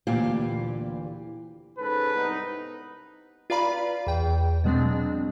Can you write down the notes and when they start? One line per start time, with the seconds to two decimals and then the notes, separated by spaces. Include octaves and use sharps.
0.07 D2 A#2 E3 G4 F5
1.78 G#2 C#4 A4 B4
2.14 C2 B3 D#4
3.50 F4 B4 D5 F5 A#5 B5
4.07 E2 G5
4.64 B2 F#3 G#3 C4 D4